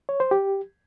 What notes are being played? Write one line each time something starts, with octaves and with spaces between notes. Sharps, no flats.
C#5
C5
G4